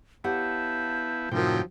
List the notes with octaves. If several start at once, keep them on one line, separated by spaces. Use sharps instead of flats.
B3 E4 G4 C#5 F5 F#5 A5 G6
F#2 A2 C3 D#3 F3 F#3 A#4 G5